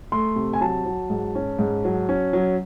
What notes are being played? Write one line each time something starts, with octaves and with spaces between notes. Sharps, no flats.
A3 C6
C3
G#5
F#3 A5
F#3
G#2
C#4
G#2
F#3
C#4
F#3